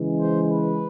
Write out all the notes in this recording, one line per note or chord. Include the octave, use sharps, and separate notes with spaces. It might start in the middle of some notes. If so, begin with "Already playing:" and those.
Already playing: C#3 E3 G#3
C5
B4